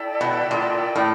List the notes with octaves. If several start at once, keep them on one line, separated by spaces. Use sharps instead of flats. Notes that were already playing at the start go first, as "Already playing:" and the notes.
Already playing: E4 A4 D5 G5
B2
A#2
A2